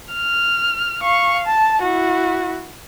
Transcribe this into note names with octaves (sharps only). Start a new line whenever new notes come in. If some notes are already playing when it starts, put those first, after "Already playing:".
F6
F5 C#6
A5
E4 F#4